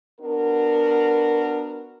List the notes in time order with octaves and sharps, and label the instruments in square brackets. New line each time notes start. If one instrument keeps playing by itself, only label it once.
[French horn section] B3 D4 F#4 A#4